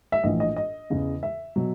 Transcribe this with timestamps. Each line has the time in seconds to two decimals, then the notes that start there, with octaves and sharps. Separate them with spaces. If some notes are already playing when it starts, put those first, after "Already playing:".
0.12 E5
0.23 A#1 A2 E3 D#5
0.40 D#5
0.56 D#5
0.90 E2 C#3 E3
1.23 E5
1.56 B2 F#3